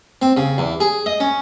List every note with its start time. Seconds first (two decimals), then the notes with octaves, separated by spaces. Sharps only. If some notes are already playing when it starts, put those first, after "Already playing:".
0.22 C4
0.37 C#3
0.58 E2
0.80 G#4
1.06 D#5
1.20 C#4